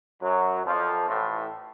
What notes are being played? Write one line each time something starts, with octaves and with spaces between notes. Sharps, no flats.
F#2 F#3
F2 F3
A1 A2